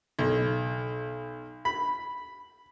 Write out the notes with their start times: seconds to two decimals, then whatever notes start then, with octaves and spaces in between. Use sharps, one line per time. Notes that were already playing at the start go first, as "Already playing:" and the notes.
0.19 B1
1.65 B5